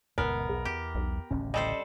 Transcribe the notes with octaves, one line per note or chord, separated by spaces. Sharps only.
D#1 C#2 F#2 B3 A#4
B1 E2 G#4
E2 G4
B1
D1 A1 C#3 C#4
G3 A4 C5 D#5 G5